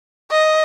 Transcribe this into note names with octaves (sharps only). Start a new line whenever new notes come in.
D#5